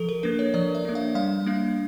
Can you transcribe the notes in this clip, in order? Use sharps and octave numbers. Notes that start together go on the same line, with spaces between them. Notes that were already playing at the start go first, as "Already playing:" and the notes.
Already playing: F3 A4
A#4
A#3 D4 B4
C#5
F3 D5
E5
A#3 D4
F5
G3 F5
A#3 D4